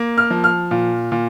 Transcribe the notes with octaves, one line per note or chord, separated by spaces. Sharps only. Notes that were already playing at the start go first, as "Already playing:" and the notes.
Already playing: A#3
F6
F3
F6
A#2
A#2